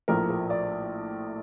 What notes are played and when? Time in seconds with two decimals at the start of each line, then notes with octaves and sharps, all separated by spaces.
0.08 A#1 A2 F3 A3 A#4
0.30 A#4
0.50 D5